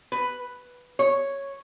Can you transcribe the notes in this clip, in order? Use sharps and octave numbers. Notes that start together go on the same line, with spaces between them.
B4
C#5